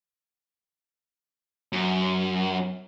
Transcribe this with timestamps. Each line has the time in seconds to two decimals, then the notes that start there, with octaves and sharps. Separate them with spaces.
1.73 F#2